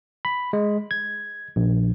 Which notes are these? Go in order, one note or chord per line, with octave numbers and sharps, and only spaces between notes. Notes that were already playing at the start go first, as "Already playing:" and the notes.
B5
G#3
G#6
A#1